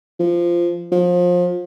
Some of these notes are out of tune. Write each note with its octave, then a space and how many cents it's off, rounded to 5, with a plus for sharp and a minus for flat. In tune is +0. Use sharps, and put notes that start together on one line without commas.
F3 -15
F3 +25